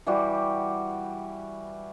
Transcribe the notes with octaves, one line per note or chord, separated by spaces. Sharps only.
E3 G3 F#4 G4